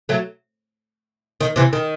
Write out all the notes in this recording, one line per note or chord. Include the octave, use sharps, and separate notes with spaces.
F#3 A3
D#3
C3 E3
D#3